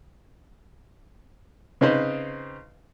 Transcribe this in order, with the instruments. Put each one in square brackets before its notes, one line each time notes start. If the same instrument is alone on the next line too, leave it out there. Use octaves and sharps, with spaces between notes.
[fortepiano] C#3 C4 D#4 B4 C5 C6